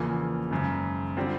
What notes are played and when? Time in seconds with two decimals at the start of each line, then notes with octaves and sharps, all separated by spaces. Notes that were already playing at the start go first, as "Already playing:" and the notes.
Already playing: E2 C#3 F3 A#3
0.51 G#1 F#2 C#3
1.17 D3 G3 C4 F4